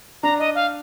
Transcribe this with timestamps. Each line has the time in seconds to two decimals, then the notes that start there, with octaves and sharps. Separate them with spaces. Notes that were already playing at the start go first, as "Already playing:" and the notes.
0.23 D4 A#5
0.39 D#5
0.55 F5